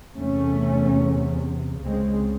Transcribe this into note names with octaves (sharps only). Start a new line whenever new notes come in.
E2 C3 A3 C#4
C#2 C#3 G#3 C4